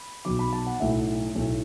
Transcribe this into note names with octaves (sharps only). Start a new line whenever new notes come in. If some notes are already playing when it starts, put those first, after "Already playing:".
Already playing: B5
B1 B2 F#3 D6
B5
A5
F#5
B1 A2 A3 E5
B1 A2 A3